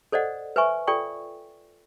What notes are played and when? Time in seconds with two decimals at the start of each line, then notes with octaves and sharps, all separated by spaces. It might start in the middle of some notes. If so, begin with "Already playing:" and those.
0.12 A4 C5 D5 D#5 F#5
0.56 B4 C5 E5 G#5 C#6
0.88 F4 A4 D5 G5 C#6